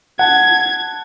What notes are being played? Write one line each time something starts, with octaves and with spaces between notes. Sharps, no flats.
F#5 A5 G#6